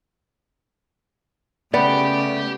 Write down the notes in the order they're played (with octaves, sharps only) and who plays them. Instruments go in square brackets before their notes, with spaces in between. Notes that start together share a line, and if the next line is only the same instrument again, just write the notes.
[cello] C#3 [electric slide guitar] A3 D5 [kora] B3 [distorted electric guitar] G4